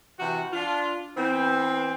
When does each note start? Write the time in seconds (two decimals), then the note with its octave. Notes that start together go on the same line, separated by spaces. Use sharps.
0.19 C3 E3 F#4
0.53 D4 F4
1.17 E3 B3 C4